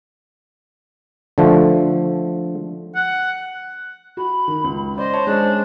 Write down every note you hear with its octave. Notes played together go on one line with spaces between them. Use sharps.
D3 F3 A3
F#5
F#4 B5
D#3
C#2
C5 D5 D#5
C#5 A5 C#6
G#3 C#4 D4 C5 D#5